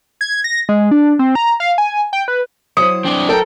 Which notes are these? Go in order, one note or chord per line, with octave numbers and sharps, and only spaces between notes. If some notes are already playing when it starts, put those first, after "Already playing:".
G#6
A#6
G#3
D4
C4
A#5
F5
G#5
G5
B4
F#3 E4 C5 D#6 C#7
C4 D4
A4 A#4 G5